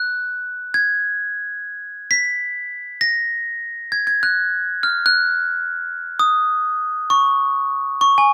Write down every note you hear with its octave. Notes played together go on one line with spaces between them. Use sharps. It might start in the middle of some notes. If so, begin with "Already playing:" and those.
Already playing: F#6
G#6
B6
A#6
G#6
G#6
F#6
F6
F#6
D#6
C#6
C#6
G#5